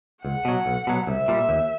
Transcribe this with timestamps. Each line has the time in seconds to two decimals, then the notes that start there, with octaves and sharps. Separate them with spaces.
0.24 C#2 F#5
0.45 B2 F#3
0.66 B1
0.87 B2 F#3
1.07 C2 E5
1.28 A#2 G3
1.49 D#2